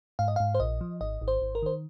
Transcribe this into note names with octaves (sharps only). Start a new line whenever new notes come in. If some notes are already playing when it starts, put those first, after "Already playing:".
G#2 F5
D#5
G#2 F5
C5
A#1 D#5
F3
G#1 D#5
G#1
C5
G#1
A#4
D#3 C5